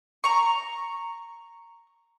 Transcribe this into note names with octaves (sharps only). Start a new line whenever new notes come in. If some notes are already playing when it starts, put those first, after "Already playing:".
A#5 C#6